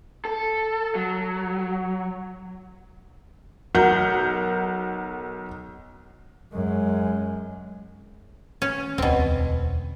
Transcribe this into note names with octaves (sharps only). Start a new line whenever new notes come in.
A4
F#3
B1 A#4 F#5 G6
F#2 G#3
C#4
E1 D2 B2 C4